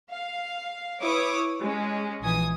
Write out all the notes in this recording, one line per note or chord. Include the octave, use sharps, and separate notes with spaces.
F5
E4 B4 C#5 D6 D#6
G#3 C#4
A#1 E3 G#5 D#6